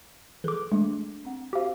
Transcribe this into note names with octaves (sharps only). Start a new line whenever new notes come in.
E3 G#4 A4 B4 D6
G#3 A3 D4
C4 F#5
F#4 G4 C5 F5